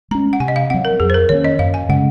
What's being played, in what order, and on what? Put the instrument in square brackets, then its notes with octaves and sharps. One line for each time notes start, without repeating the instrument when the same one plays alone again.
[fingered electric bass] G#3 C#4 [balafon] A#5
[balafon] F#5
[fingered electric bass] C3 [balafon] G#5
[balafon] D#5
F5
[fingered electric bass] F#3 C4 [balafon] F#5
[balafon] A#4
[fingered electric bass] F2 [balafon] G#4
[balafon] C5
A#4
[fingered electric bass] D#3 A#3 C#4 [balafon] C#5
[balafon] D#5
[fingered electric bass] F#2 [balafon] F5
[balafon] G#5
[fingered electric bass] C#3 G#3 C#4 [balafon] F#5